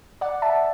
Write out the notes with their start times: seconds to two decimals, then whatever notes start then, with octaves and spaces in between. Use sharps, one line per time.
0.21 D5 F#5
0.42 E5 A5